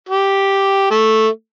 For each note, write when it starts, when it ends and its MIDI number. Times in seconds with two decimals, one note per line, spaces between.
0.09 0.86 67
0.91 1.28 57